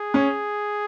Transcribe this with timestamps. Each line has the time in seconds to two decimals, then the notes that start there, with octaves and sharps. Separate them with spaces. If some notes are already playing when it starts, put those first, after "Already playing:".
Already playing: G#4
0.14 C#4